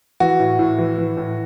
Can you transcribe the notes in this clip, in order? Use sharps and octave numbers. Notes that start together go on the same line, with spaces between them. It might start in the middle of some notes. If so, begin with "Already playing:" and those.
E3 F#4
A2
A2
E3
E3
A2